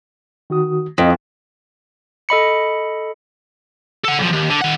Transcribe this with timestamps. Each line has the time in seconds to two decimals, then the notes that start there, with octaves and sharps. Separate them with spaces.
0.50 D#3 F#4 D#6
0.98 F2 D#5 D#6
2.29 A4 D#5 B5 C#7
4.05 A4 F#5
4.19 B1 F3
4.33 D#2
4.50 D3
4.62 D#3 F#5